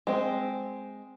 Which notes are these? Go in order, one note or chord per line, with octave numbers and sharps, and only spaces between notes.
G#3 C4